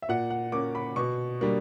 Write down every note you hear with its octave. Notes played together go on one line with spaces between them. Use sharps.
E5
A#2 F#5
F#5
A#3 C#4 D6
B5
B2 C#6
G3 A#3 D4